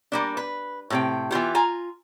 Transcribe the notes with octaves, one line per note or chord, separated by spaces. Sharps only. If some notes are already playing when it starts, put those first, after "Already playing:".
G3 A#3 D4
B4
A2 C3 G5
E3 B3 F4 G4
F4 G#5 A#5